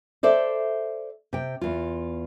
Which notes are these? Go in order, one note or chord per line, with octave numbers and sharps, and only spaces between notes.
A4 C5 D5 E5
C3 G5
E2 F4